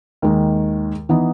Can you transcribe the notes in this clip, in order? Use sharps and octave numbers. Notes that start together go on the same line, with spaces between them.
D#2 D#3 G#3
E3 B3 D#4